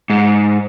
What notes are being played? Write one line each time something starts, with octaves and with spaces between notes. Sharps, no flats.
G#2